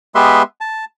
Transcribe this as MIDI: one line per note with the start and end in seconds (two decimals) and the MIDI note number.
0.15 0.43 56
0.15 0.43 59
0.15 0.43 67
0.15 0.43 71
0.15 0.43 76
0.15 0.43 84
0.61 0.85 81